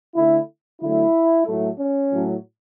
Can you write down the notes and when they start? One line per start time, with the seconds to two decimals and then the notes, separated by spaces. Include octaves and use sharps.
0.15 D3 A3 E4
0.81 D3 F#3 A3 E4
1.46 A2 F#3 A3
1.79 C#4
2.12 A2 F#3 A3